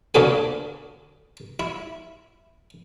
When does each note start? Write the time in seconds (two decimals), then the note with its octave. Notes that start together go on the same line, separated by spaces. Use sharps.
0.15 D2 A#2 D4 F#4 A4 G#5
1.60 E4